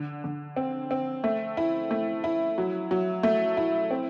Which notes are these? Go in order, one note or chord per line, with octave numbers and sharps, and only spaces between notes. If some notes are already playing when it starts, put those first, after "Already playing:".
Already playing: D3
D3
C4
C4
A3
E4
A3
E4
F#3
F#3
A3
E4
C4